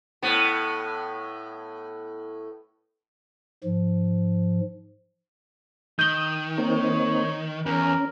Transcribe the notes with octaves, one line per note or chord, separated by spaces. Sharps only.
A2 B3
G#2 F3
D#3 D#6 G6 G7
A#3 C4 D#4 C#5
E2 C#4 A#4